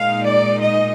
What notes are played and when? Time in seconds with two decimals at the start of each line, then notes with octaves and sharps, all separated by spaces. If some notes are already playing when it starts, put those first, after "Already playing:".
Already playing: A#2 G#3 D#4 F5
0.25 D5
0.60 D#5